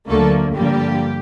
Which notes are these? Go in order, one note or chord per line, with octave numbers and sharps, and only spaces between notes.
D2 D3 F#3 A3 A#3 A4
G2 D3 F3 G3 A#3 G4